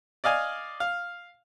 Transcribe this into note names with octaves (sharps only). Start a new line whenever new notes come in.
D5 D#5 F5 G#5
F5